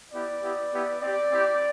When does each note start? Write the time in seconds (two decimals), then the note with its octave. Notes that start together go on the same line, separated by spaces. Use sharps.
0.11 B3 E4 G4 D5
0.41 B3 E4 G4
0.71 B3 E4 G4
1.00 C4 G4 D5
1.30 C4 E4 G4